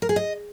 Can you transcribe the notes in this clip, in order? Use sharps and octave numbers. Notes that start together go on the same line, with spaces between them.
A#4
G#4
D#5